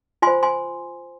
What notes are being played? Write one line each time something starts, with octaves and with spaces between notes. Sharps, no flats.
F4 C5 G#5 C6
G#5 C6